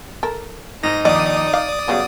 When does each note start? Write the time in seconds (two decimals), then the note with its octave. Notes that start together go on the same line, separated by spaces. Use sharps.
0.23 A4 A#4
0.83 G#2 D#4 A#6
1.05 A#1 D#2 D5 D#5 D#6
1.53 F5 D6
1.88 C#3 F#3 G3 B3